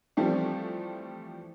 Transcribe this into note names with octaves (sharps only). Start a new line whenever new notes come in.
E3 F3 G3 A3 C4